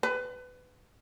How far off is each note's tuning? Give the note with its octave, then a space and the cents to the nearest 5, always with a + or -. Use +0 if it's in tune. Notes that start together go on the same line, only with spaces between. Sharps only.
B4 +20